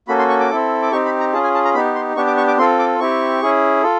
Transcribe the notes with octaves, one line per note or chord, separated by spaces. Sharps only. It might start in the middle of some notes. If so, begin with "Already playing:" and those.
A#3 C#4 F#4 A4 B5
C6
C#6
D6
C4 E4 A4
D6
C4 D#4 G4 C#6
B5
A#5
C#4 F4 G#4 A5
G#5
A5
A#5
B3 D#4 G4 B5
C6
B3 D4 G4 C#6
D6
C#6
D6
C4 F4 A4 C6
D6
C4 E4 G4 C#6
C#4 E4 G#4
F4 A4